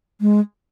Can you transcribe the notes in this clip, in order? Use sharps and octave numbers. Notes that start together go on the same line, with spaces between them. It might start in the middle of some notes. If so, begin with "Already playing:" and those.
G#3